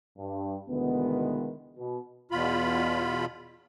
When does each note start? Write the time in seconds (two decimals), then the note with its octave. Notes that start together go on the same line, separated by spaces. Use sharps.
0.18 G2
0.69 D2 B2 D#3 E3 G#3 B3
1.78 B2
2.31 E2 B2 F4 B5